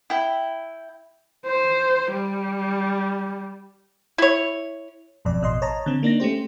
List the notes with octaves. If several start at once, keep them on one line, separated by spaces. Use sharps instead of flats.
E4 G5
C5
G3
E4 C#5
G#1 F2 B2 D5
A1 B2 D#5 C6
C#5 D#5 A5 A#5
D3 C4
A#3 D4 D#4 A#6
A3 C#4 G4 C5